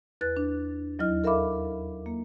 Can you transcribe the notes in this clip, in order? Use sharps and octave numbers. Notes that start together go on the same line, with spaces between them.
E2 B4 F#6 A6
D4
D#2 F#3 E4 D#5 F6
A4 A#4 E5 F5 B5 D6
A#3